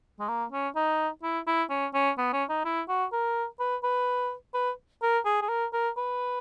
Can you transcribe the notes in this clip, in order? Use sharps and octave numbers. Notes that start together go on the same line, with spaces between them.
G#3
A#3
C#4
D#4
E4
E4
C#4
C#4
B3
C#4
D#4
E4
F#4
A#4
B4
B4
B4
A#4
G#4
G#4
A#4
A#4
B4